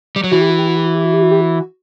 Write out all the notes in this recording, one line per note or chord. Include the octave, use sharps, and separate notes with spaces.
G3
F#3
E3 F#4
G4
F#4
G4
F#4
G4
F#4
G4
F#4
G4
F#4
G4
F#4